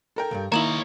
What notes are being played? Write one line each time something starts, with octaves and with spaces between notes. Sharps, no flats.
A4 A#4 G5
C#2 G2
D#3 A#3 E4 C#5 D#5 A#5 E7 F#7